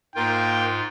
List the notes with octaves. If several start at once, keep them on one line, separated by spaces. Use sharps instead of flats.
G#2 A#3 F4 A#4 G5